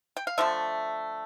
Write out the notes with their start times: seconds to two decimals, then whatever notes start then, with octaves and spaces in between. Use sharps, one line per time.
0.17 G5
0.27 F5
0.38 D3 F3 A3 E5